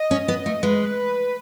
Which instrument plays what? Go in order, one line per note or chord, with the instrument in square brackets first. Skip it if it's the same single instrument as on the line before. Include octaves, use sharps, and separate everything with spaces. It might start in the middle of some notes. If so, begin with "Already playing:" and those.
Already playing: [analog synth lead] D#5
[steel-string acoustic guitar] C#4
B3
A3
[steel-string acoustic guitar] G#3 [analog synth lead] B4